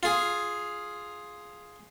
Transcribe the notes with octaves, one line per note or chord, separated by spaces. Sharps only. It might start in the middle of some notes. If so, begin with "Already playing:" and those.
F4 G#4